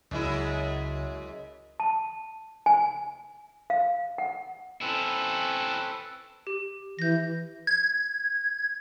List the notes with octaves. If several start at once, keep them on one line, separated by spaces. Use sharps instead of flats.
C#2 F#2 G#3 E4
A5
G#5
F5
F#5
C4 C#4 E4 A4 B4
G4
E3 G6 A#6
G#6